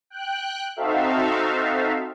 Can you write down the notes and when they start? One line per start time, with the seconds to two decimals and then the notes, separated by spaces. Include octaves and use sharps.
0.10 G5 F#6
0.76 C4 D#4 F#4 A4 E5 F5